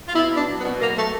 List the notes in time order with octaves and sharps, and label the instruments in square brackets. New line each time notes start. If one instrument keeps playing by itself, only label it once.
[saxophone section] F4
B2 E4
B2
D4
F#3
B3
B2
F#3 A#3
A3